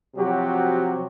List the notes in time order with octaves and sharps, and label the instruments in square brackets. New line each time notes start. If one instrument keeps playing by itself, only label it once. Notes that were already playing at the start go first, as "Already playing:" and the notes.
[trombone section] C3 F3 F#3 F#4 G4